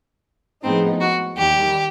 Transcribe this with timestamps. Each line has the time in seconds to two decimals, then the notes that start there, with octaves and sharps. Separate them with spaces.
0.63 A2 F3 G#3 B3 C4 D#4
1.01 F#4
1.38 D#2 D#3 G3 G4